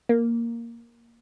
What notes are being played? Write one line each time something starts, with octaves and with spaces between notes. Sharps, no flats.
A#3